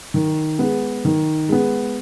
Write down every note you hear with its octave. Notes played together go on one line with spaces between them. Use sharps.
D#3
G#3 B3
D#3
G#3 B3